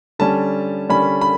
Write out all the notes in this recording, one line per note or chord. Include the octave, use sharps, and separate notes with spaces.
D3 G3 C#4 A5
D3 G3 C#4 B5
B5